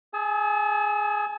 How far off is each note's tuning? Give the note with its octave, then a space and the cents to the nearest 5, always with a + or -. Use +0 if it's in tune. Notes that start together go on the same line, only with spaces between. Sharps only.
G#4 +0 A5 -35 E6 -40